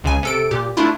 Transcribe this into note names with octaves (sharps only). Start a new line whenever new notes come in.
C#2 C#3 G#5
C3 A4 D7
A#2 G4
A3 D4 E4 F4